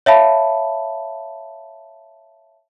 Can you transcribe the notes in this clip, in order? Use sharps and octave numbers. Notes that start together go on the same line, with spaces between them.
C#5 E5 F5 A5 B5